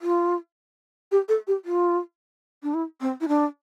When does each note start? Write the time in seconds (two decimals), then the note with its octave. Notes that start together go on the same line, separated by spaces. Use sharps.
0.02 F4
1.12 G4
1.28 A4
1.47 G4
1.65 F4
2.63 D4
2.74 E4
3.01 C4
3.21 E4
3.28 D4